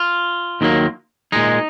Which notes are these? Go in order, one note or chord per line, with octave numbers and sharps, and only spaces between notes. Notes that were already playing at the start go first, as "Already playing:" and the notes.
Already playing: F4
D#2 D#3 F#3 A#3
A#2 G#3 D#4